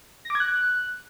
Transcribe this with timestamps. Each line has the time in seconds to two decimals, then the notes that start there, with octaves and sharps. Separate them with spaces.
0.25 A#6
0.30 D6
0.35 G#6
0.40 F#6